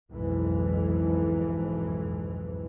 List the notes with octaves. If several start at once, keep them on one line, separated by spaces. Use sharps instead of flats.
B1 F2 G#2 E3